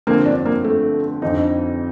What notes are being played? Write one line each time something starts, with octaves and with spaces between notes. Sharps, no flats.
G1 G2 D3 F3 A#3 C4
D4
A#3
A3
F2 D3 F3 C4 D#4